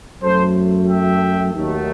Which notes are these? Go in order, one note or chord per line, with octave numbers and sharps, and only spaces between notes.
F#2 F#3 A3 A4 C5
E5 G5
D#2 D#3 F#3 A3